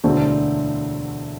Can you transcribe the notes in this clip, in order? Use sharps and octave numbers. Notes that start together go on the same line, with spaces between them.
E1 D2 D3 A3 C4